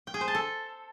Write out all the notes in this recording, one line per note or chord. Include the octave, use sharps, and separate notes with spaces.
G5
G#4
C5
A5
A4